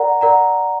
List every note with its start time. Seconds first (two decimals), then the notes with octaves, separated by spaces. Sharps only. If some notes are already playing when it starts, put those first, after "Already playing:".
Already playing: A#4 D5 F#5 A#5
0.21 A#4 D5 F#5 A#5